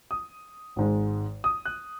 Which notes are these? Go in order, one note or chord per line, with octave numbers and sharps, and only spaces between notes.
D#6
G#1 G#2 G#3
D#6
F#6